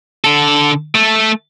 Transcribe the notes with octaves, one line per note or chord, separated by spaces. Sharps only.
D3 A4
A3